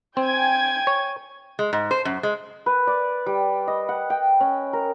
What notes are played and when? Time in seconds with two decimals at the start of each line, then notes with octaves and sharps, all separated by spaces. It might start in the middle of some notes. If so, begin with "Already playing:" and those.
0.17 C4 G5 G#5 G#6
0.87 C#5
1.59 G#3
1.73 G#2
1.91 C5
2.05 F#2
2.23 G#3
2.66 B4
2.87 D5
3.26 G3
3.68 D#5
3.89 F#5
4.10 G5
4.41 C#4
4.73 A#4